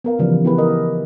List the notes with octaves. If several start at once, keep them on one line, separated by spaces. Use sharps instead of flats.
B3 A#4 F5
C#3 E3 F3 G3
B3 E4 G4 G#4 B4
A#4 D#5